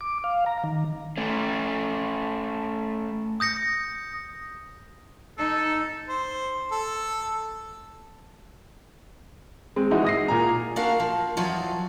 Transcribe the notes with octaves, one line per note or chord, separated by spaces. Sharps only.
D6
F5
A#5
D#3
A3 C#4
D#6 G6 A#6 C#7
D#4 A4
C5
A4
G#3 C4
E3 G#3 D#4 E4 F#4
D#6 A#6 C7
A#2 G#5 A#5
A#3 D4 F#4 A#4 F5
F3
E2 F3 F#3